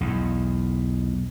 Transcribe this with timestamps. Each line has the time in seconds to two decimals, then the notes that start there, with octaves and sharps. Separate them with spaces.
0.01 B1 E2